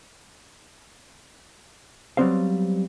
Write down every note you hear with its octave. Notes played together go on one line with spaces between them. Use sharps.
F#3 G3 B3 C4 C5 F5